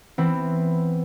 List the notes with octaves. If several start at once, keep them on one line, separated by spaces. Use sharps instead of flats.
E3 B3 C4 E4